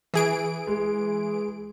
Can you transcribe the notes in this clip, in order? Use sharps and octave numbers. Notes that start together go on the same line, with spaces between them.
E3 G#4 D7
G#3